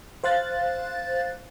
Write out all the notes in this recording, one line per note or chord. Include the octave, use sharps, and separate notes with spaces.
C5 F5 F#6 A6